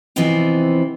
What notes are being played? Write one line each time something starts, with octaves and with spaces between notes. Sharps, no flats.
C3 E3 F3 B3 C4 D#4